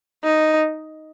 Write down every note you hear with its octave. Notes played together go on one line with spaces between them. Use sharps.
D#4